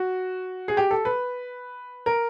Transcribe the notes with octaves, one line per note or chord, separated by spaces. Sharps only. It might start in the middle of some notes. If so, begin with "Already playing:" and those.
Already playing: F#4
G#4
G4
A4
B4
A#4